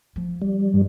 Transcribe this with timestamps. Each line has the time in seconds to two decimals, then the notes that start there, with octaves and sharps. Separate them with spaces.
0.16 F3
0.41 G3
0.73 G2